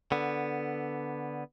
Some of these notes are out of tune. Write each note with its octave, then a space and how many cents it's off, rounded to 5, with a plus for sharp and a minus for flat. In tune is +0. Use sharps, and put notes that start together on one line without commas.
D3 +0 B3 +0